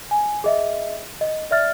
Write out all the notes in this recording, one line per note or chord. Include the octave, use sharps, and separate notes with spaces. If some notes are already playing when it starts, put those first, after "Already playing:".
G#5
G#4 D#5 E5
D#5
D5 E5 F6 A6